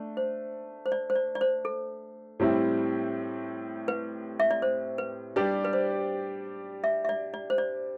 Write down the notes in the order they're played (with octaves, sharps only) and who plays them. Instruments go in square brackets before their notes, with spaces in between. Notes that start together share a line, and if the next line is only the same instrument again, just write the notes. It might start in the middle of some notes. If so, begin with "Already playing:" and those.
Already playing: [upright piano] A3 D4
[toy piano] C5
C5
D5
C5
D5
D5
C5
A4
[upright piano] A2 G3 C4 E4
[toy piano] B4
E5
D5
C5
B4
[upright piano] G3 D4 G4 D5 [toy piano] B4
[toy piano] B4
C5
E5
E5
D5
D5
C5
D5